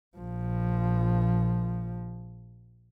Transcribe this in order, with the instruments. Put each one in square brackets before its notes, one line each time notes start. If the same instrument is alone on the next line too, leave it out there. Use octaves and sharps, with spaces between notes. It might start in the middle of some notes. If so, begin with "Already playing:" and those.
[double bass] A#1 F3